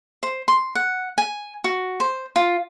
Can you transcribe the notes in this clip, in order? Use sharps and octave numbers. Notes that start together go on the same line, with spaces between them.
C5
C6
F#5
G#5
F#4
C5
F4